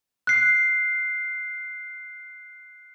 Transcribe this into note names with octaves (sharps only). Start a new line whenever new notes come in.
F#6 C7